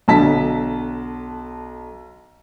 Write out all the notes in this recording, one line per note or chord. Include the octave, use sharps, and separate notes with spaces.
B1 D3 A5 B6